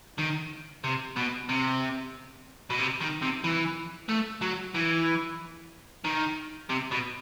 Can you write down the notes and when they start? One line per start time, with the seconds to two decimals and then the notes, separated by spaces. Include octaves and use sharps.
0.19 D#3
0.84 C3
1.16 B2
1.49 C3
2.70 B2
2.80 C3
3.01 D#3
3.22 C3
3.44 E3
4.09 A3
4.42 F#3
4.74 E3
6.04 D#3
6.70 C3
6.91 B2